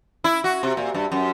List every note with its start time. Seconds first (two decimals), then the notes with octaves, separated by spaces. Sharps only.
0.24 E4
0.44 F#4
0.63 C3
0.77 A#2
0.94 G2
1.12 F#2